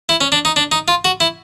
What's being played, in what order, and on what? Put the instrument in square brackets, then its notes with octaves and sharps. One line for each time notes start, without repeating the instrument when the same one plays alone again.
[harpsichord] E4
C#4
D4
D#4
D4
D#4
F4
F#4
E4